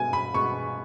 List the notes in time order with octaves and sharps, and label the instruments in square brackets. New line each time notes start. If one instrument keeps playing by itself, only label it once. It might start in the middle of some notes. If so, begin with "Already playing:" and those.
Already playing: [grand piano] B2 G#3 B3 [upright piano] G#5
[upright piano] B5
[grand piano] B2 G#3 B3 [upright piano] C#6